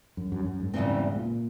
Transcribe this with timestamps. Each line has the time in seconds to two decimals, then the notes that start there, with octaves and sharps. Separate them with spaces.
0.17 F#2
0.32 F#2
0.45 F#2
0.60 G#2
0.73 E2 G#2 C#3 E3 G3 C4
1.16 A#2